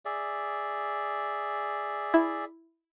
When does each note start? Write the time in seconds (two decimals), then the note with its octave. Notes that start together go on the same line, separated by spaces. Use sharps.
0.05 G#4 D5 E5
2.14 E4